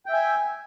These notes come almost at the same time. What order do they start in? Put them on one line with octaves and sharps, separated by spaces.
G5 E5 G#5